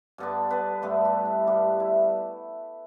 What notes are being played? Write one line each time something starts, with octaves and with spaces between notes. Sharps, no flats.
G2 D3 B3 D4
B3 B4
G2 D3 A3 B3 D4 A4
G4
E4
G2 G3 B3 D4 G4
E4